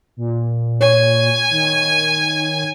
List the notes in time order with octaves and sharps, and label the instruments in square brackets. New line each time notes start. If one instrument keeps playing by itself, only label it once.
[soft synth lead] A#2
[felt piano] C#5 [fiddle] G#5
[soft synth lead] D#3